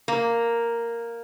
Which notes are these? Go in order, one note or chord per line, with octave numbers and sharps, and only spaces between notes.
A#3